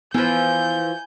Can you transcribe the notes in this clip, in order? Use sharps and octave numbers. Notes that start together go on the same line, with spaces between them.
E3 F3 B3 G#5 B5 G6